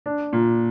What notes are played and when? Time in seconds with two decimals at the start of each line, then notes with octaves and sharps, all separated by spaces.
0.06 D4
0.33 A#2